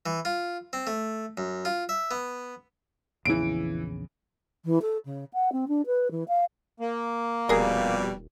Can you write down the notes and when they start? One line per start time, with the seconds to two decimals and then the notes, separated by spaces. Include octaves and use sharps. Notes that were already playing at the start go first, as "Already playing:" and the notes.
0.06 E3
0.25 F4
0.73 C4
0.87 A3
1.38 F#2
1.65 F4
1.89 E5
2.11 B3
3.25 A#1 E2 C#3 E3 D7
4.64 E3
4.82 A4
5.05 C#3
5.33 F#5
5.52 C4
5.68 D4
5.86 B4
6.11 E3
6.28 F5
6.80 A#3
7.49 D#1 F2 B2 G3 G#4 A#4